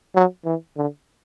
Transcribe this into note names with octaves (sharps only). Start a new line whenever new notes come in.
F#3
E3
D3